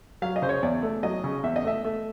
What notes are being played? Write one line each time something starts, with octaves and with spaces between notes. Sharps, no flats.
F#3 F5
D#5
C#3 C5
C#5
E2 D5
A3
F#3 D#5
C#3
E2 E5
D#5
A3 E5
A3